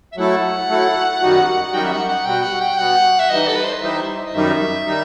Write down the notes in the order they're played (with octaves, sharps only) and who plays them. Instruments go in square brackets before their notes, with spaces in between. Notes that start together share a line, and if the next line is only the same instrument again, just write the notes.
[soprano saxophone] E5
[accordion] F#3 A3 E4 A4 [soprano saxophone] F#5
[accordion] F#3 A3 E4 A4
F#2 D#3 G3 D#4 F#4
[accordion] F#2 D#3 G3 D#4 F#4 [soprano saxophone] G5
[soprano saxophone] E5
F#5
F#5
[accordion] B2 G3 B3 F#4 [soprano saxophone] G5
[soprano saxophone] F#5
G5
[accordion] B2 G3 B3 F#4 [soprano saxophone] F#5
[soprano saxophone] E5
[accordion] E3 G3 D#4 [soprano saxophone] D#5
[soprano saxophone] A4
B4
C5
D#5
[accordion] E3 G3 D#4 [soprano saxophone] E5
[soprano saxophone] C5
E5
D#5
[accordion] F#2 D#3 G3 D#4 [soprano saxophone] E5
[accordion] D#3 G3 D#4